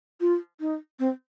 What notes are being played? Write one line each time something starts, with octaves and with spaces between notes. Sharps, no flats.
F4
D#4
C4